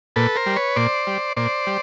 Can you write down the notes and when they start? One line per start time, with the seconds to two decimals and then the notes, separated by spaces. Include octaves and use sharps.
0.16 A#2 A4 B4
0.36 A#4 C5
0.46 G3
0.56 B4 C#5
0.76 A#2 C5 D5
1.07 G3
1.37 A#2 C5 D5
1.67 G3